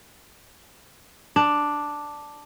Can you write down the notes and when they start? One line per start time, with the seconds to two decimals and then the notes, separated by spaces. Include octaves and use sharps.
1.36 D4